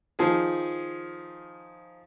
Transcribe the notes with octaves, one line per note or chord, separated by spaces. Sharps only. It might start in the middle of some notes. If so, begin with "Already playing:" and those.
D#3 F3 G#4